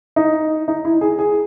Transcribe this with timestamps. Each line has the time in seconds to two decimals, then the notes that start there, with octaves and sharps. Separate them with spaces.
0.16 D#4
0.68 D#4
0.85 E4
1.01 G#4
1.19 G#4